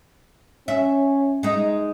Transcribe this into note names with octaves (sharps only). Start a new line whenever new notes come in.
C#4 E5
G#3 D#4